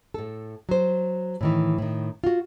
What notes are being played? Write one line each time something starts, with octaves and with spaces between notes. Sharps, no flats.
A2 A4
F#3 C5
A2 D#3 E3
A2 D#3
F4 F#4